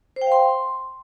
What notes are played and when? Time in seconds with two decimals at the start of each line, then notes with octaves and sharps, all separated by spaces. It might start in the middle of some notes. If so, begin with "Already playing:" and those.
0.16 C5
0.21 G5
0.27 F5
0.32 C6